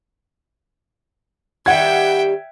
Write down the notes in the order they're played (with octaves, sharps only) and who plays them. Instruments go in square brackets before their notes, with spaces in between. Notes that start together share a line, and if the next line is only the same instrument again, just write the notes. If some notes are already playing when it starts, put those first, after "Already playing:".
[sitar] D#3 G3 [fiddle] E5 G5 [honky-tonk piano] F#5 G#6